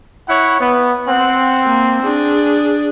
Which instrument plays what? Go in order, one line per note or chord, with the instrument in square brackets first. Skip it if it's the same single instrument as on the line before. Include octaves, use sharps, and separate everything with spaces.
[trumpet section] E4 C#5 F#5
B3
[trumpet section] C4 [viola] F#5
[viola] A#3
D4 G#4